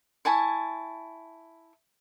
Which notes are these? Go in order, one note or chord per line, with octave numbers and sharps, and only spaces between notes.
E4 G#5 A5 C#6